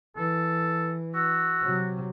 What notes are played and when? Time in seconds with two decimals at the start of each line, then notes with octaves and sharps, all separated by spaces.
0.17 E3 A4
1.15 F#4 E6
1.63 C3 F#3